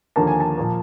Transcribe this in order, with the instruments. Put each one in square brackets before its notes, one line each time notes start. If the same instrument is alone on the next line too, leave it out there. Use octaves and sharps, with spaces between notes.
[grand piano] D#2 D3 F3 A#3 A5
G#5
A5
A#2 F3 A#3